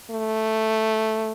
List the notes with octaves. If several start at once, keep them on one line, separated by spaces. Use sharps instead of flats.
A3